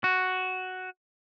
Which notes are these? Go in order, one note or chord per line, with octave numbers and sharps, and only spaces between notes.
F#4